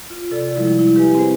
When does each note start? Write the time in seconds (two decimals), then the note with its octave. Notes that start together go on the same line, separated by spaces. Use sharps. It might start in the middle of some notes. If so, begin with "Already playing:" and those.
0.10 F4
0.31 C3 A4 D5
0.56 F3 G3 G#3 E4
0.79 E4
0.96 G4 B4 E5 G#5
1.15 C4 G#4 C5